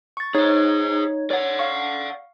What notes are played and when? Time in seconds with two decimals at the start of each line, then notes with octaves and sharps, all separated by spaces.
0.17 C#6 A6
0.35 D#4 G#4 C5 C#5 G#6
1.31 C#5 D5 F#5
1.59 F5 C#6